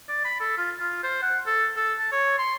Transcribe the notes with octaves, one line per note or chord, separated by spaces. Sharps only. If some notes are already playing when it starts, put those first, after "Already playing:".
D5
B5
A4
F4
F4
C5
F#5
A4
A4
A5
C#5
C6